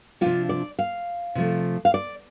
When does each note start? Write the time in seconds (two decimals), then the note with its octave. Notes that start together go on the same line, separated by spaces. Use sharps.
0.21 C3 F3 D4 F4
0.49 D5
0.79 F5
1.35 C3 F3 A3
1.85 F5
1.94 D5